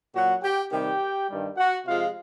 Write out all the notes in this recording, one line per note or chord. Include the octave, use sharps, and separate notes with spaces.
A#2 F#3 F#4 F#5
G4 G5
C3 D#3 G3 G4 G5
G2 D#3 G3
F#4 F#5
C3 F3 G#3 F4 F5